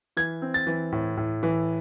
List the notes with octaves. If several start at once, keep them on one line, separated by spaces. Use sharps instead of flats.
E3 G#6
C4
A6
E3
A2
A2
E3